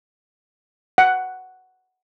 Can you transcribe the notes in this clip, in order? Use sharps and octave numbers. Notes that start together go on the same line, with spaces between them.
F#5